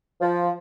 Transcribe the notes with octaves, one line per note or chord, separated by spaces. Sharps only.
F3